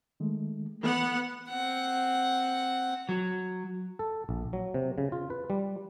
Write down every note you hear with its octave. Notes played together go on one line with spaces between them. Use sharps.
D#3 G#3 A3
E3 B3 F#5
C4 F#5
F#3
A4
A#1
F#3
C3
C#3
F4
B4
G3